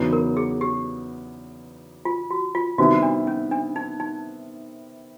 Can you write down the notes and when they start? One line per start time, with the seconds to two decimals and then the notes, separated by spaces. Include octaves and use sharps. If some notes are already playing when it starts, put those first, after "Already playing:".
Already playing: E2 C#3 F#3 B3 D#4
0.13 A#4
0.37 G#4
0.61 G4
2.05 F4
2.31 F#4
2.55 F4
2.78 C3 D#3 G3 B3 E4 F#4
3.03 D4
3.27 C#4
3.51 D4
3.76 D#4
4.00 D#4